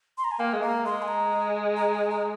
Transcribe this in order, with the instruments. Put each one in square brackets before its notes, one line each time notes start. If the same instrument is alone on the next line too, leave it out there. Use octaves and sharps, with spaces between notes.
[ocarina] C6
A#5
G#5
[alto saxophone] A#3 [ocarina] G5
[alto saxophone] G#3
[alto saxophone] A#3 [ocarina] A#5
[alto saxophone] G#3 [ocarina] C6
[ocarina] G#5
A#5
A#5
G#5
A#5